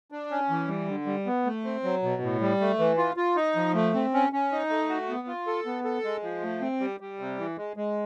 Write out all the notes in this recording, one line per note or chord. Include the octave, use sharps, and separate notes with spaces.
D4
C#4
E3
G3
D3
G3
B3
A3
C4
F#3
B2
A2
G3
A3
E3
F4
F4
D#4
F3
A3
C4
C#4
C#4
D#4
A3
F#4
B3
F4
A4
B3
A4
G#3
F3
A3
C4
G3
G3
C3
E3
G#3
G#3